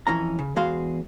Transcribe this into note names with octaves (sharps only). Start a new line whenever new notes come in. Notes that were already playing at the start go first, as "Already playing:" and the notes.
F2 E3 C#4 A#5
C#3
E2 G#3 F#4 G#4 F5 C6